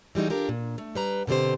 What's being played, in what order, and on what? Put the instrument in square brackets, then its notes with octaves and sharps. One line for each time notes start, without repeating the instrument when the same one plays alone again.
[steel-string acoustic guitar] E3 G3 G#3 D#4 F#4
D4 F4 G4 A4 A#4
A#2
A3
G3 B4 A#5
B2 D3 C4 G4 C5